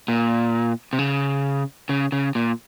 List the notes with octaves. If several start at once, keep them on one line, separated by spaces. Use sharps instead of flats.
A#2
C3
C#3
C#3
C#3
A#2